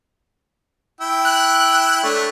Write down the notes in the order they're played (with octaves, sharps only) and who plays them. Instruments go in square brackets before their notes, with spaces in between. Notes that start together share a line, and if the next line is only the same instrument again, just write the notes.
[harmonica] E4 G5 E6
[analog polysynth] F#6
[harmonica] A3 D4 C#5